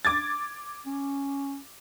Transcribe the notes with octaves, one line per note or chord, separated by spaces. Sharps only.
D6 G#6 A6
C#4